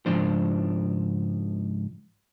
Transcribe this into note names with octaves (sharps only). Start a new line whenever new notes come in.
C#2 G#2 F3 D4 C5